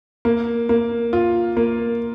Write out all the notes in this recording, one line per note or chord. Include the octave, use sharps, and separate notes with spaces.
A#3
A#3
F4
A#3